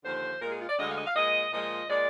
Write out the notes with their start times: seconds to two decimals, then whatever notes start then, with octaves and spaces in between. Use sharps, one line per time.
0.04 D#2 D3 F3 C5
0.41 A#2 G#3 A#4
0.51 G#4
0.60 F4
0.69 D5
0.78 D2 D3 G#3 D#5
0.88 F5
0.97 D#5
1.06 F5
1.15 A#2 G#3 D#5
1.52 A#2 F3 G#3 D#5
1.90 A#2 G#3 D5